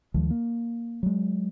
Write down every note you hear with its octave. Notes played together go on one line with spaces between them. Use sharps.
D2 D#3 F3 G#3
A#3
F#3 G#3